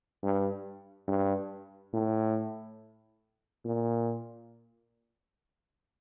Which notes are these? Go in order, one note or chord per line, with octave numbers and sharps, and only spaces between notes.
G2
G2
A2
A#2